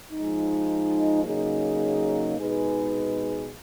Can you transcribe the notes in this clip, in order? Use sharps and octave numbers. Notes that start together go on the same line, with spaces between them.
F3 G#3 D#4
C#3 F#3 A#3 D#4 G#4
B2 G#3 D#4 G#4 B4